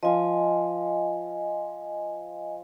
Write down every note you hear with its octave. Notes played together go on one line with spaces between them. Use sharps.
F3 F4 D#5 G#5